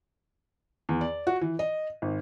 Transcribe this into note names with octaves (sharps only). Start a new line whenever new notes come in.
E2
D5
F#4
E3
D#5
G#1